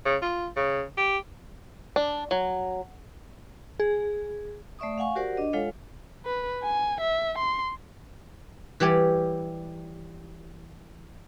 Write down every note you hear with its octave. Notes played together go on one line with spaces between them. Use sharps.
C#3
F4
C#3
G4
D4
F#3
G#4
A3 D5 E5 C#6 D#6
F5 F#5 G#5 C#6
F#4 G4 A#4 C5 D5 F#5
D4 D#5
G#3 F4 A4 C#5 F5 F#5
B4
G#5
E5
C6
E3 G3 G4 C#5 D5